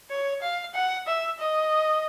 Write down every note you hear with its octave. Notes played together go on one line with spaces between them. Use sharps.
C#5
F5
F#5
E5
D#5